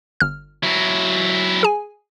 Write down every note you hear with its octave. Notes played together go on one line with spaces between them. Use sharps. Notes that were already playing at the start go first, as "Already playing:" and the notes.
G1 F6
F#3 E4
G#4 G#5